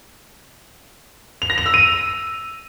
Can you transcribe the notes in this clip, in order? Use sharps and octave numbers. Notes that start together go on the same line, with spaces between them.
F7
A#6
F7
E6
D#7